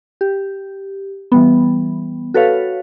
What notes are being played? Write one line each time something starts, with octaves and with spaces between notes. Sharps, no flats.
G4
E3 G3 B3
F#4 A4 B4 C#5 F5